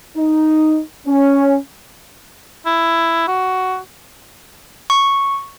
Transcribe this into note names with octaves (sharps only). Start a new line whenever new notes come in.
D#4
C#4
E4
F#4
C#6